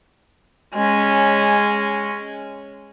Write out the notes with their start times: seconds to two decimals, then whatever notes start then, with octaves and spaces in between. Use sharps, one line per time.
0.74 G#3 C#4